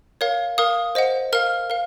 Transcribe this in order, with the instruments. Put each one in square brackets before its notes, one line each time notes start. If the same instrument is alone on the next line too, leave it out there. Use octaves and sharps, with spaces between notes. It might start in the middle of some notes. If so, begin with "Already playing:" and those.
[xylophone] A#4 C#5 F5
A#4 F5 D#6
C5 D#5 F#5
A#4 F5 F6
A#4 F5